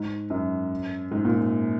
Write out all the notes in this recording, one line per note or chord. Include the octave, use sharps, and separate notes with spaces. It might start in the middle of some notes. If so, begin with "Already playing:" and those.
Already playing: G#2
F#2
G#2
A#2